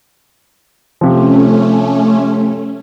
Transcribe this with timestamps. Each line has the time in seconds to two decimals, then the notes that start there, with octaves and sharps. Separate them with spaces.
1.01 C3 F3 A3 C#4